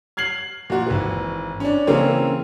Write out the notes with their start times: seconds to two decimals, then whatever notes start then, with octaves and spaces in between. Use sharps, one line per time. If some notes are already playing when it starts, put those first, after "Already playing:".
0.17 F6 G#6 C7 F#7
0.70 A#2 F#4
0.86 G#1 E3
1.60 C#4 D4
1.87 C#3 E3 A#3 C4 C#4